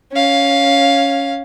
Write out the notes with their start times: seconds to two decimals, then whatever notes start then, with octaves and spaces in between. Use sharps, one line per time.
0.13 C#4 F5